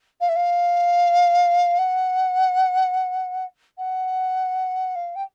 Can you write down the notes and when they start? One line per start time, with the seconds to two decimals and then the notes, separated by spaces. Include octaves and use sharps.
0.20 F5
0.28 E5
0.35 F5
1.78 F#5
3.77 F#5
4.95 F5
5.15 G5